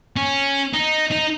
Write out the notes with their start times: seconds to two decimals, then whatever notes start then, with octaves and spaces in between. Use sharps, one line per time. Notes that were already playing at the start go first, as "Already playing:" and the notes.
0.16 C#4
0.73 D#4
1.11 D#4